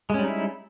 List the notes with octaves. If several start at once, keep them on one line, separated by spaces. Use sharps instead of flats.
G3 G#3 C#4 D#4 E4